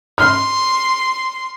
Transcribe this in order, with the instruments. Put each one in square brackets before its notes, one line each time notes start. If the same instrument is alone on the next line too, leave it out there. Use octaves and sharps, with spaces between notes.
[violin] C6 [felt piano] F6